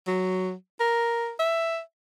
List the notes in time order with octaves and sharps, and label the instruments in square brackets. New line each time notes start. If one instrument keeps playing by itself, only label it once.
[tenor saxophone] F#3
A#4
E5